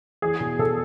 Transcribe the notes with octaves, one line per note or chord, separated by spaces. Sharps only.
E2 G#4
B2
B2 A4